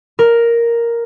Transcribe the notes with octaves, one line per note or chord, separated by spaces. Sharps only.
A#4